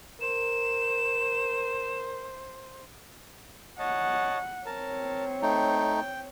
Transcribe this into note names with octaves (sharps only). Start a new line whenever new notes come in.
A#4 C5 E7
C#5 D#5 F#5 A5
C4 A#4 C#5 A5
A3 D#4 G5